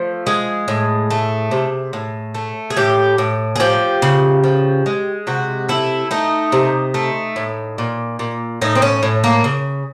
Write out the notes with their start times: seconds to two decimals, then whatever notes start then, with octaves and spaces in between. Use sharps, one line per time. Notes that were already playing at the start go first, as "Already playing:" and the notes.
Already playing: F3 A3
0.26 G#3 G#4
0.68 A2
1.10 A3
1.51 C3
1.93 A2
2.34 A3
2.70 G#4
2.76 A2 G4
3.18 A2
3.56 G#4
3.60 F3 G4
4.02 C#3
4.43 F3
4.86 G#3
5.27 C3 F#4
5.69 A3 E4
6.11 A3 D#4
6.52 C3
6.94 A3
7.36 A2
7.78 A#2
8.19 A#2
8.62 A2 D#4
8.75 C4
8.82 C#4
9.03 A2
9.24 A#3
9.44 C#3